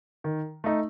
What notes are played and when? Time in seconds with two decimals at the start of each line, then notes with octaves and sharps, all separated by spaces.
0.24 D#3
0.64 A3 D#4